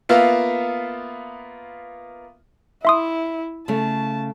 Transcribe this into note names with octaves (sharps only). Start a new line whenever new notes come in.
A#3 B3 F4 E5 F5
E4 E5 C6 D#6
C#3 A3 A5